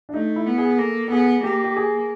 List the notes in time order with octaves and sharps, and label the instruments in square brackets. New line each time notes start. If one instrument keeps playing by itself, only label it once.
[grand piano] D4
[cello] A3 [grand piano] D#4
[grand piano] E4
[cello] B3
[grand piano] G#4
[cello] A#3 [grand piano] A4
[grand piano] A4
[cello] B3 [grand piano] G#4
[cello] A#3 [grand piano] G4
[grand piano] G4
G#4